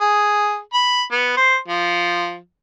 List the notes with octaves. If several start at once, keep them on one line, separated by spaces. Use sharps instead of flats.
G#4
B5
B3
C5
F3